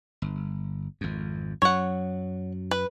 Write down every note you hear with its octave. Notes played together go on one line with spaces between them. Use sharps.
G1
G#1 F2
F#2 F#3 C#5 F#5
B4